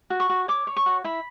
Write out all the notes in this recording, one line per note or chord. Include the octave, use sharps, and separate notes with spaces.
F#4
C#6
F#4
C#5 D6
C#5
C#6
F#4
E4 B5